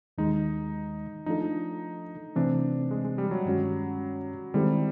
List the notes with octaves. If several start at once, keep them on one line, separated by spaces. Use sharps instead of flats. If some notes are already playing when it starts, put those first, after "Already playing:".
D#2 D#3 G#3 D#4
F3 A3 D4 D#4 F4 A4
C3 E3 A3 C4 D4
G#3
G#3
G3
F#3
G2 D#3 G#3 C#4 F#4
D#3 G3 G#3 C4 E4 A4